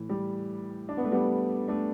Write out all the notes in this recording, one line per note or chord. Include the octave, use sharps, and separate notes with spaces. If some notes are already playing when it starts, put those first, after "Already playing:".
Already playing: A2 E3
G3
D4
B3
A3
G3 B3
A3 D4